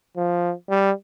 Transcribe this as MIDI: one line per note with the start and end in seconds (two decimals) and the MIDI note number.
0.17 0.53 53
0.69 0.92 55